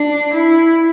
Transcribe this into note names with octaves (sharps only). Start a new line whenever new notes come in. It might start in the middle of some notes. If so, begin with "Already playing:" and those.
Already playing: D4
E4